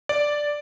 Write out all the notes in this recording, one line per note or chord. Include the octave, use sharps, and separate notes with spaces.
D5